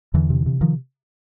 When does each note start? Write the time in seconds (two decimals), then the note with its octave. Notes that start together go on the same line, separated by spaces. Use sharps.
0.14 E2 D3 E3
0.30 C3
0.46 C3
0.61 D#3 F3